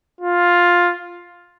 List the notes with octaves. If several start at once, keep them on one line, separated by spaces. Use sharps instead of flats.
F4